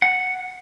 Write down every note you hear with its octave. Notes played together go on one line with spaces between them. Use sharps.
F#5